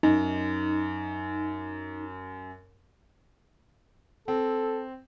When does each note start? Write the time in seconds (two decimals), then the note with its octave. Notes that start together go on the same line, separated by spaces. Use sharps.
0.03 F#2 D#4
4.28 C4 A4